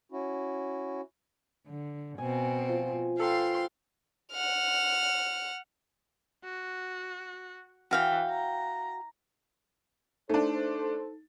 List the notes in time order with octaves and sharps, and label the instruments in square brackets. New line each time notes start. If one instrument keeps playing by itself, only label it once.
[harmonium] C#4 E4 F#4
[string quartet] D3
[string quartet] B2 C4 [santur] G#5
[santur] F3
[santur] A4 B4 [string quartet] F5 G5 C6
[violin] F#5 F6
[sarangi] F#4
[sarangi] E3 [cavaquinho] F#4 F5 G5
[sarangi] A#5
[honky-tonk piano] A3 D4 [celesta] D#4 [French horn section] A4 C5